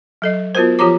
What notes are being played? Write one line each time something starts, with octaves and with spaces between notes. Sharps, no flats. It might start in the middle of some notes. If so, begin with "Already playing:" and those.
F#3 A4 D#5
B3 F4 F#4 A#4 C5
F3 F4 G4 C#5 A#5 D6